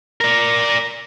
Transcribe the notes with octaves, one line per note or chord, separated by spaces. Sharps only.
A#4 D5